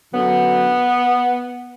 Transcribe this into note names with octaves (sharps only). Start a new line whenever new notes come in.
F#2 D3 F#3 B3